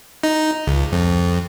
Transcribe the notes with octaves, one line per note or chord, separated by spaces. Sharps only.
D#4
C#2
F2